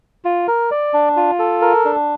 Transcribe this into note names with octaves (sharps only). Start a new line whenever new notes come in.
F4
A#4
D5
D4
F4
A4
A#4
D4